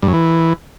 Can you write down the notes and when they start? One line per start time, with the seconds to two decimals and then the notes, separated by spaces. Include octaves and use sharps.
0.02 G2
0.08 F#2
0.13 E3